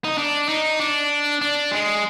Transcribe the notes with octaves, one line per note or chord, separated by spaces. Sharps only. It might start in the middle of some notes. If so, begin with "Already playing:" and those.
D#4
D4
D#4
D4
D4
G#3